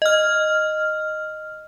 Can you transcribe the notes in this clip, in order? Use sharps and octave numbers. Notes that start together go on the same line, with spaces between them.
D#5 F6